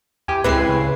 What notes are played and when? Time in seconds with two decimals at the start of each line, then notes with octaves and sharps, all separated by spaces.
0.28 E2 G4 G#5
0.44 C#2 G#3 C4 E4 B4 C7
0.69 C#3